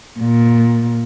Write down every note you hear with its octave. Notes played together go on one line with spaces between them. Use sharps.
A#2